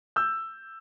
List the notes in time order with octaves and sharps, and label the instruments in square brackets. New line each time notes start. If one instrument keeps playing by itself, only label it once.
[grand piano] E6 G6